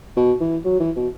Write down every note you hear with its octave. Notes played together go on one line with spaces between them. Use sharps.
B2
E3
F#3
E3
B2